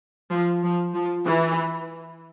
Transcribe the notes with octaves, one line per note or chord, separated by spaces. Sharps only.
F3
F3
F3
E3